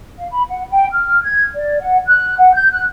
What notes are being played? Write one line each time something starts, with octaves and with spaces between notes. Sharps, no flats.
F5
B5
F#5
G5
F6
G#6
D5
F#5
F#6
F#5
G6
F#6